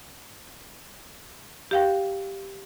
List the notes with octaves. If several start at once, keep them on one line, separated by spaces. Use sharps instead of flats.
G4 F5 G5